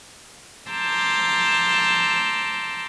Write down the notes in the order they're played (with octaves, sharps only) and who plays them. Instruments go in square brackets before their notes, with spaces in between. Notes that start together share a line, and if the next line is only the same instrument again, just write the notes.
[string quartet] A5 A#5 C6 D6 E6 G6